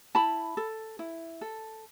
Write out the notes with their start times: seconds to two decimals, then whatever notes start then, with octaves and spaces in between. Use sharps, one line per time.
0.15 E4 A5 B5
0.57 A4
0.99 E4
1.41 A4